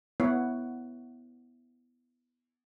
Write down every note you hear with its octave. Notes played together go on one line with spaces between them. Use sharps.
B3 E4 C#5 F#5